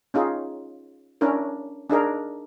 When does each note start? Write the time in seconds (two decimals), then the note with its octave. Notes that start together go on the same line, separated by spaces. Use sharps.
0.14 C#4 D#4 F4 G#4
1.21 C#4 D4 E4 A#4
1.90 D4 D#4 G#4 A#4